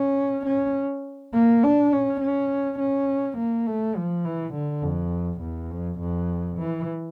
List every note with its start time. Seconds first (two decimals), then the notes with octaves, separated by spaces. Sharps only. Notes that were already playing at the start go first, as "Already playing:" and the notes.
Already playing: C#4
0.46 C#4
1.34 A#3
1.63 D4
1.92 C#4
2.21 C#4
2.79 C#4
3.37 A#3
3.66 A3
3.96 F3
4.24 E3
4.54 D3
4.83 F2
5.41 E2
5.71 F2
5.99 F2
6.58 E3